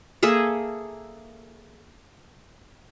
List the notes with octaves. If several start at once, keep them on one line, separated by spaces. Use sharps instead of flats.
A#3 G#4 A4 E5